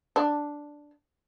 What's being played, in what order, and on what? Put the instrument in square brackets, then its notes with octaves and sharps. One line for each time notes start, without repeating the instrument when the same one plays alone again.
[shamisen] D4